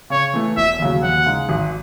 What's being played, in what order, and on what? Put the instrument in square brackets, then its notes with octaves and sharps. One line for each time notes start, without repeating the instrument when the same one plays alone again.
[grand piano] C#3 [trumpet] C#5
[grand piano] E3 A3
[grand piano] E1 [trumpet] E5
[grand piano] D#2 C#3 F#3
[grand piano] D#2 [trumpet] F#5
[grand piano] C#3 G#3 D#4
G#1